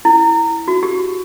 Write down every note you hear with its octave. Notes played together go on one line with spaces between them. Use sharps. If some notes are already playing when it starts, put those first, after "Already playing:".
E4
F#4
G4